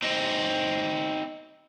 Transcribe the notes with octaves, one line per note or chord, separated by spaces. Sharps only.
C4 D#4